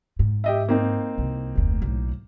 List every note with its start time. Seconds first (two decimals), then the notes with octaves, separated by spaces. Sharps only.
0.19 G#2
0.44 G4 D#5 E5
0.69 A#3 C4 D#4
1.18 C2
1.56 F1 D2
1.82 B1 A2